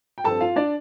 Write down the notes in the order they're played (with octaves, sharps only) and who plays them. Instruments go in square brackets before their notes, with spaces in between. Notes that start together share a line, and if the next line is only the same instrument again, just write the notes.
[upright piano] G5
G2 F3 C4 A4 A5
F4 F5
D4 D5